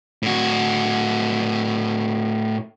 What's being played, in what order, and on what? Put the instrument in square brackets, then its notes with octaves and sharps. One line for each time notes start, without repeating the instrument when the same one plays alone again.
[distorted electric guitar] A2 F#4